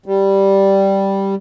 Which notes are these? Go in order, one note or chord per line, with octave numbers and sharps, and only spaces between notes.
G3